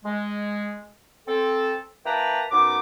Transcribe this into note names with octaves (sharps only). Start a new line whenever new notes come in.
G#3
C4 A4
A#3 E4 B4 G5 A5 A#5
F#2 B3 D#4 D6